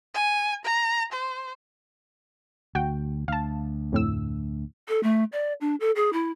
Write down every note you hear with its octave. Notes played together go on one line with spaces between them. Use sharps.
G#5
A#5
C5
D2 F#4 G5
D2 F5 A5
F2 A2 E6
A4
A3
D5
D4
A4
G#4
E4